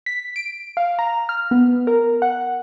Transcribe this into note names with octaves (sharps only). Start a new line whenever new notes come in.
B6
D7
F5
A#5
F6
B3
A#4
F#5